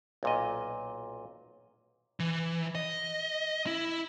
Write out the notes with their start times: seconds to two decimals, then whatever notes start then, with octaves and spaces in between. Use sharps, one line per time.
0.23 B1 A#2 D#5
2.20 E3
2.75 D#5
3.67 E4